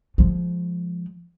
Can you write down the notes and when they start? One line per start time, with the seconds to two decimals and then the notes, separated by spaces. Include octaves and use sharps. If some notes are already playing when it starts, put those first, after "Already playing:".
0.18 F3 G#3